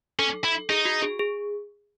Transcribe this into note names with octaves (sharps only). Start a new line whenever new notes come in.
C#4 A4
E4
D#4 G#4
F#4
G#4
G#4